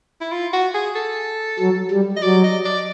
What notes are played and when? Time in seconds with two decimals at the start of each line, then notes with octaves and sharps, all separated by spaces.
0.21 E4
0.32 F4
0.53 F#4
0.74 G#4
0.96 A4
1.59 F#3
1.91 G3
2.17 D#5
2.23 F#3 D5
2.44 D#5
2.65 D5